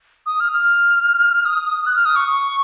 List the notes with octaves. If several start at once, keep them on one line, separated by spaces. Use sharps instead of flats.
D#6
F6
F6
D#6
F#6
F6
D#6
C#6